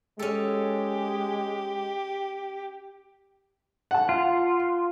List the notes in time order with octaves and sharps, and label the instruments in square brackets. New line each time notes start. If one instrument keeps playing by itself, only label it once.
[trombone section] G#3 [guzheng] C#4 A4 [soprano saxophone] G4
[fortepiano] F#5 A5
[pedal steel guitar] F4